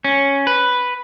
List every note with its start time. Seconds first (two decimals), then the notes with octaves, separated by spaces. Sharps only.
0.04 C#4
0.47 B4